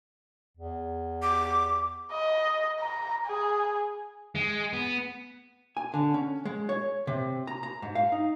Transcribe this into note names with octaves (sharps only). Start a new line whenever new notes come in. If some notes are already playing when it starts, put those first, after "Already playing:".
E2
D6
D#5
A#5
G#4
G#3
B3
G#5
D3
C#4
G#3
C#5
C3
A#5
A#5
G#2
F5
D#4